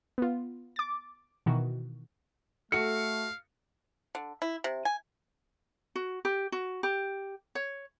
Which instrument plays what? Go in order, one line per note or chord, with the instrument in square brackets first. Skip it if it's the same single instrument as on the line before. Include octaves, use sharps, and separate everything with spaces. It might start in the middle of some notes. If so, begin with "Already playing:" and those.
[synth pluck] B3 F4
D6 A6
B2 D#3 E3 F#4
[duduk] A3 [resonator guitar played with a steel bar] F#4 A4 [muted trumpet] F5 [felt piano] C#7
[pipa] D3
E4
C3
G#5
[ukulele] F#4
G4
F#4
G4
C#5